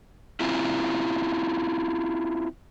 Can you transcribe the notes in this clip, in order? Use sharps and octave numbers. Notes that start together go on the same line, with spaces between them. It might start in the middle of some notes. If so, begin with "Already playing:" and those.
C4 E4 F4